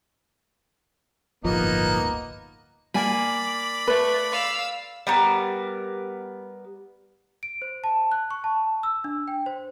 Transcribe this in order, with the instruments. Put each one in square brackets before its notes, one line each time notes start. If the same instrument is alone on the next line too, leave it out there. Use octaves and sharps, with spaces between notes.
[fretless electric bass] D1 G1 F3 [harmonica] A#3 B3 D#4
[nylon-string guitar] A#3 G#5 [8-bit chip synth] D5 B5
[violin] A3 [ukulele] B4
[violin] F5 E6
[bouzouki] G3 B3 A#4
[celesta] D7
C5
A5
F#6
C#6
A5
E6
D4
G5
C5